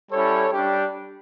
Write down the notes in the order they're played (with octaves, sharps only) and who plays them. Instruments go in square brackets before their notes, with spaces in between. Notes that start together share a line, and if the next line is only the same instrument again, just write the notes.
[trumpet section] G3 C#4 E4 A4 C#5
G3 D4 G4